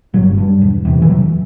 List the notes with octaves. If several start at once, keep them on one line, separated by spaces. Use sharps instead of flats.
G1 F#3
G2
E1
E2 C3
E3
E1 F#3